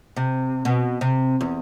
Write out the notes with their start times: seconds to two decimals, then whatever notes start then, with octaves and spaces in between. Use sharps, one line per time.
0.16 C3
0.65 B2
1.01 C3
1.41 E2